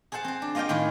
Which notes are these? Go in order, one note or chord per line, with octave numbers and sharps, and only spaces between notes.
G#4 A4 C5 F#5 A5
C4 C5
D4
A#3 F4 D#5 F5 G5
A2 D#3 G#4 G5 C6